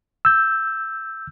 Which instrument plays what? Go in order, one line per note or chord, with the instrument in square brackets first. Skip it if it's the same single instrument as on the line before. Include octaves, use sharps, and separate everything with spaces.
[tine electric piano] E6 G6